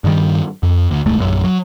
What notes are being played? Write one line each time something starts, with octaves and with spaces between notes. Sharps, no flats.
G2 D#3 G3
F2
D2
D#1 C2 G#2 A3
A#1 F#2
F#3